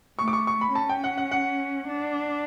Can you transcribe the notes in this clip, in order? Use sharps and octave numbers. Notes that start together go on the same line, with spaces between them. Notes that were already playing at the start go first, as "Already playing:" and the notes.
A3 C#6
D6
C#6
C#6
B5
C#4 A5
G5
F#5
F#5
F#5
D4